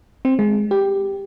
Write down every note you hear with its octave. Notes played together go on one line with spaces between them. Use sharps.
C4
G#3
G4